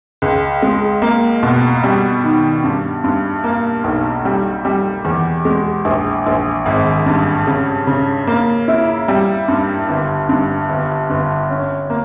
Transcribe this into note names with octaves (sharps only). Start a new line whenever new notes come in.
C#2
G#3
A#3
B2
G3
D#3
G2
G2
A#3
B1
G3
G3
E2
G#3
A#1
A#1
G#1
G2
C#3
C#3
A#3
E4
G3
G2
G1
G2
G1
G1
C#4
A#3